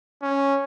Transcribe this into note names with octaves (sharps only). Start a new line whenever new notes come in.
C#4